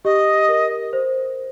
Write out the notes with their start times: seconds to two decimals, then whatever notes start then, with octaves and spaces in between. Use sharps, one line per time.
0.05 G4 D#5
0.49 A#4
0.93 C5